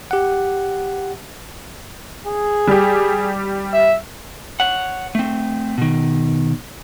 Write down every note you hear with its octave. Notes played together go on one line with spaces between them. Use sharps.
G4 F#5
G#4
G3 G4
E5
C#5 F#5
A3 C4
B2 D#3